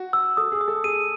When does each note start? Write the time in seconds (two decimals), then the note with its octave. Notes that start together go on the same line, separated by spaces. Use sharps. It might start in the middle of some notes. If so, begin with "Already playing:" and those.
Already playing: F#4
0.13 E6
0.37 A4 D#6
0.52 G#4
0.61 D#6
0.68 A4
0.84 G#4 D#7